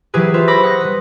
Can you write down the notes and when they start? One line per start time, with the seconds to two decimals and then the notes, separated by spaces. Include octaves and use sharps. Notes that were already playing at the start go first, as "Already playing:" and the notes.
0.14 E3 F#3 E4 G4 G#4 B4
0.34 F4 B4 C5 E5
0.48 B5 C#6 D6 E6 A#6
0.63 F#5 C6 D#6 G6 A#6
0.81 G3 B4